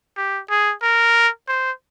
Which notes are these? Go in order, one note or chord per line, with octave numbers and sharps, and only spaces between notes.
G4
G#4
A#4
C5